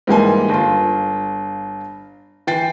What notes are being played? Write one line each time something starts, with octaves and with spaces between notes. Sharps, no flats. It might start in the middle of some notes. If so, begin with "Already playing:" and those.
G#2 E3 G3 A#3 G#5
G1 F4
E3 G5 A6 C7